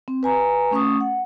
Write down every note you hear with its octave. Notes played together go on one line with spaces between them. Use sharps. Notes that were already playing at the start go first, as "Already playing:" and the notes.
C4
B4 G#5 A#5
A3 C#4 C#6 D#6
F#5